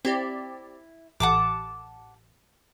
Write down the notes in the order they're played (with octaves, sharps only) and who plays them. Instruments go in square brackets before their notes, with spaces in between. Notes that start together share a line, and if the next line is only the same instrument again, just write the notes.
[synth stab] C4 G4 D5 [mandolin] E4
[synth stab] A1 [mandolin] F#5 A5 D6